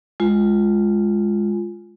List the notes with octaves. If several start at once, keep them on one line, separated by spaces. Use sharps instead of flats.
G#3 F4